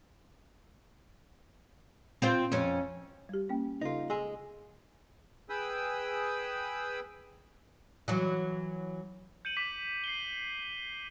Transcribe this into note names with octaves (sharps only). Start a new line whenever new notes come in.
C4 F4 C5
F2 C#4
G3 G4
A#3 C#4 G5
C#3 D#4 F4 A4
G#3 G#4 G#5 C6 E6
G#4 B4 G5 B5 D#6 E6
E3 F#3
G6 C#7 D#7 F#7
D6 B6
C7 D#7 G7